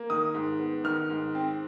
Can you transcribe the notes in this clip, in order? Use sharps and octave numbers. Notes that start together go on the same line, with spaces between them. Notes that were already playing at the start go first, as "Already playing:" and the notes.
Already playing: A#3
D#3 D#6
G#2
B3
D#3 F6
G#2
C4